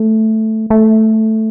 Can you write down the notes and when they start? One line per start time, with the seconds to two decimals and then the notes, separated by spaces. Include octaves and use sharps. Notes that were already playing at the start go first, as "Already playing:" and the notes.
Already playing: A3
0.70 A3